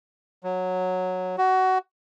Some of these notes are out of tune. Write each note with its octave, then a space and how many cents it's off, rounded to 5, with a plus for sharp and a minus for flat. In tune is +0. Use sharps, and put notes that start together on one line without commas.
F#3 -10
F#4 +20